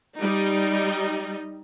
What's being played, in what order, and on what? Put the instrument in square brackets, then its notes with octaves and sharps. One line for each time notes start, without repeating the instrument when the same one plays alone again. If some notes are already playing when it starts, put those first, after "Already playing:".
[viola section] G3 D#4